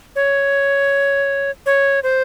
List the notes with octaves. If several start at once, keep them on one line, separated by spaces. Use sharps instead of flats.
C#5
C#5
C5